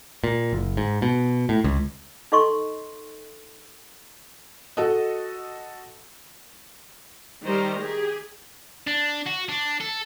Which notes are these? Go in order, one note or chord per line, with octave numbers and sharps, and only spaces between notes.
A#2
F#1
G#2
B2
A2
C#2
D#4 A4 D#5 C6 C#6
F#4 A4 D#5
D#3 G3 C5 A#5
G4 G#4
D4
F#4
D4
A4